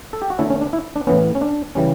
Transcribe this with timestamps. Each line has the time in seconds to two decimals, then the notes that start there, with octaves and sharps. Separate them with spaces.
0.13 A4
0.22 G4
0.30 F#4
0.39 D3 A3 C#4 E4
0.50 C#4
0.61 D4
0.73 E4
0.96 D4
1.07 A2 E3 B3 C#4
1.35 C#4
1.41 D4
1.75 C#3 E3 G3 C#4